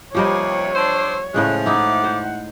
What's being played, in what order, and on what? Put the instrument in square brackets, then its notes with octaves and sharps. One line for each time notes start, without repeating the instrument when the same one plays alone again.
[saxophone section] D#2 C3 [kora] F3 G3 D#5 [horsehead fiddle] C#5 [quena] D6
[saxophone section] D4 C5 [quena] E6
[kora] A2 C#3 G#3 [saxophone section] F3 A3 [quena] F#6
[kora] D#4 E4 [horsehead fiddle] F#5 [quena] D6
[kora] C5